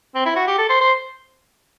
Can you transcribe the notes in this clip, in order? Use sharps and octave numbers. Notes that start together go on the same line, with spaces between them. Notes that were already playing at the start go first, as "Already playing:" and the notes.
C4
E4
F#4
G4
A4
C5
C5